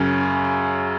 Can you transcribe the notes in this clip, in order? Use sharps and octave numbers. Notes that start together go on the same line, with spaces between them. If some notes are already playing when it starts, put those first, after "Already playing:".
Already playing: F#2 C#3